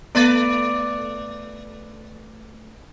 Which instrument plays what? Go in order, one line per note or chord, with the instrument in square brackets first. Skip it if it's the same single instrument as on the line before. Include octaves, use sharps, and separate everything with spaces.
[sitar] A3 B4 D5 [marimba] B3 A6